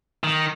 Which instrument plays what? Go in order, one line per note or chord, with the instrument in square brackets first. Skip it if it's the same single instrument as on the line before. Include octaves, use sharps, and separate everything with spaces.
[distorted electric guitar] D#3